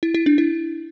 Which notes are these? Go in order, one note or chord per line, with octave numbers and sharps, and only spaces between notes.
E4
E4
D4
E4